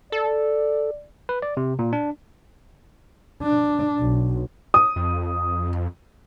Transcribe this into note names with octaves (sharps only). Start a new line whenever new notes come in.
A4 D5
B4
D5
C3
A#2
D4
D4
B1
D#6
F2